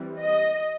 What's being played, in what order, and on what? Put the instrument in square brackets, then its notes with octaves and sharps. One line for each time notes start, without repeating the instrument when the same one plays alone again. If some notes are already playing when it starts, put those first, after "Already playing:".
Already playing: [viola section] E3 G3 C4
D#5